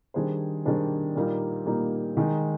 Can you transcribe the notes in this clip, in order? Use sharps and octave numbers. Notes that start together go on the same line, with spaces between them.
D#3 G3 D4 G#4 C5
D#3 G3 D4 G#4 C5
A#2 G3 A#3 D#4
A#2 G3 A#3 D#4
D#3 G#3 D#4